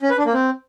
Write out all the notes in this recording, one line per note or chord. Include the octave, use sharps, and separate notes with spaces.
C#4
B4
D4
A#3
C4